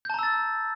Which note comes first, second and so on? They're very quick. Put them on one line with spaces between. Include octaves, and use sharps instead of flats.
G6 A5 A#5 E6 A6